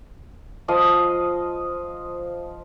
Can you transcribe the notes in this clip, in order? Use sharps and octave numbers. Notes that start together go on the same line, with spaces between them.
F3 D#5 F5 D#6